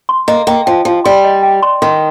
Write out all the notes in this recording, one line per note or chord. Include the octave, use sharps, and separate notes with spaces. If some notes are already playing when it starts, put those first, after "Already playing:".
C6
A#3 D#5
A#3 G5
F3 G5
F3 G4
G3 C6
D#5
G5
C6
D#3 C6